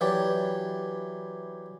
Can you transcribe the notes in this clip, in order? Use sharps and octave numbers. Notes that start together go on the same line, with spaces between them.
E3 F#3 G4 D5